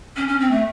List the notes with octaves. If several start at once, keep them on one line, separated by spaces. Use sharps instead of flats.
C#4
C#4
C4
A3